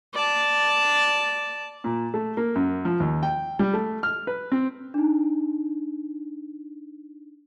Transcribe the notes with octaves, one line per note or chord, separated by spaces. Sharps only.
D5 A5
A#2
A3
A#3
F#2
F3
D#2
G5
G3
A3
F6
B4
C4
D4 D#4